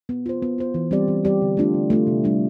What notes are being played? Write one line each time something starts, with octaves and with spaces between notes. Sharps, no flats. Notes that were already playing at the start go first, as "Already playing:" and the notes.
B3
F4 C5
B3
F4 C5
E3
G3 C4 G4 D5
E3
G3 C4 G4 D5
D3
A3 D4 F4
D3
A3 D4 F4
C3
G3 D4 F4